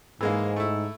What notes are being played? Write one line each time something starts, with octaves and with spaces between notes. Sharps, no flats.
G#2 E3 G#3 A#3
A3 E4